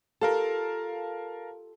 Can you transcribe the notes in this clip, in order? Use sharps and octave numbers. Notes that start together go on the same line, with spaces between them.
F4 G4 A4 A#4 F5 A5